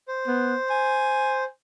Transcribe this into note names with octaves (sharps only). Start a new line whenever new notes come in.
C5
B3
G#5